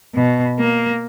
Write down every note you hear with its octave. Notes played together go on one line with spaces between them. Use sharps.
B2
A#3